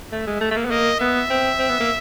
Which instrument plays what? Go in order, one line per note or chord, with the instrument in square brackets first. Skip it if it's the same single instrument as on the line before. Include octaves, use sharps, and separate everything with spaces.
[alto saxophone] A3 [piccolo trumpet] E5
[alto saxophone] G#3
A3
A3
A#3
B3
[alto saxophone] A#3 [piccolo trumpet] D#5
[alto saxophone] B3 [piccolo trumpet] E5
[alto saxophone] C4
C4
B3
A#3